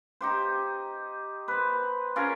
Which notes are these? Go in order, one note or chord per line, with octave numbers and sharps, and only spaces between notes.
D#4 G4 C5
B4 C5
C#4 F4 G#4 A#4